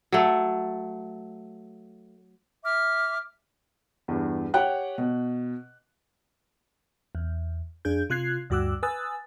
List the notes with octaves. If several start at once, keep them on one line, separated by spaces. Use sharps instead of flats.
F#3 A3
E5 D6 F6
E2 G2
G4 C#5 F#5 G5 F#6
B2
E2
F2 D4 G#4 G6
C3 F4 F#6 G#6 C7
D2 G2 F#4 D6 E6 F#6
B4 G#5 D#6 E6 F#6 A6